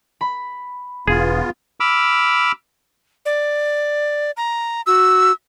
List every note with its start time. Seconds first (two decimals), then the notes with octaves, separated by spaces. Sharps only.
0.21 B5
1.08 E1 B3 F4 G#4
1.80 B5 D6 E6 F6
3.25 D5
4.37 A#5
4.87 F#4 E6